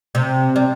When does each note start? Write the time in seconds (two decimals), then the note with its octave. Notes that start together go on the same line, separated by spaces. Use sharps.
0.15 C3
0.56 G3